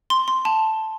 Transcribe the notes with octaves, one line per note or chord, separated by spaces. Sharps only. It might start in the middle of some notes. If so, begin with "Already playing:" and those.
C6
C6
A5